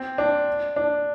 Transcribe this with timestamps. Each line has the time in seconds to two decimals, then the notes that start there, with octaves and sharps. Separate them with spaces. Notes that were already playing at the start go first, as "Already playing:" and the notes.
Already playing: C4
0.18 D4
0.76 D4